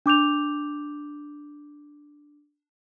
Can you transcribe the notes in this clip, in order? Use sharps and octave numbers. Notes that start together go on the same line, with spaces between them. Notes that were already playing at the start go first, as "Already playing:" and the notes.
D4 D6 G6 F7